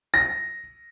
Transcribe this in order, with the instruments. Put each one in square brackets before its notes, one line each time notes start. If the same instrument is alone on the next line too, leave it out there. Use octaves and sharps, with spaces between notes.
[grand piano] A#6